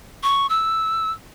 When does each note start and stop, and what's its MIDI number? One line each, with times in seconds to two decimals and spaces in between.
0.23 0.47 85
0.50 1.12 88